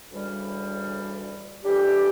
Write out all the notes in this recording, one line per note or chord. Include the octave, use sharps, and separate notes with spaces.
D2 C#3 E3 G3
F2 E3 G3 D4 G4